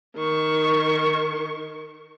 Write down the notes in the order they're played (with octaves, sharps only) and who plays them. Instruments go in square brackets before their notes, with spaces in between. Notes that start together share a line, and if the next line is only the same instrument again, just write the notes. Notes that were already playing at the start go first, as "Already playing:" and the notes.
[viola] D#3 C#6